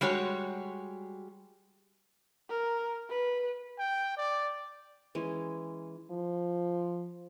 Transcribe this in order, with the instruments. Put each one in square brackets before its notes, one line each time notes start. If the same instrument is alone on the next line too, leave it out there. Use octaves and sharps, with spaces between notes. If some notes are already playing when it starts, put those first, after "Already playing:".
[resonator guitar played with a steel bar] G3 G#3 F#4 C#5
[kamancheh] A#4
B4
[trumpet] G5
D5
[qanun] E3 G#3 C#4
[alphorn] F3